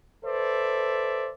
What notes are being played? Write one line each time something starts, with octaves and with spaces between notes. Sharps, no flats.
A4 B4 C5 D5 E5